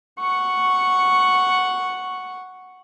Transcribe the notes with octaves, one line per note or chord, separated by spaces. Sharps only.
F#5 C#6